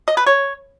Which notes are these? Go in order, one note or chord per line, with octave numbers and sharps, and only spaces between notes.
D#5
B4
C#5